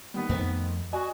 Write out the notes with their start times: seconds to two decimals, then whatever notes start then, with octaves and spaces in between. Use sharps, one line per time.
0.14 D#3 G3 B3
0.29 F2 D#3 A3 C4
0.93 F#4 D5 D#5 G#5